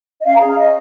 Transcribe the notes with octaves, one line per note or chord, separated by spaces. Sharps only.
D#5
C#4 F5
A#5
G#4 F5
C#4 D#5